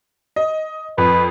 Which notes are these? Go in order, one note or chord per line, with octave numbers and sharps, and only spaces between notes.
D#5
F2 B4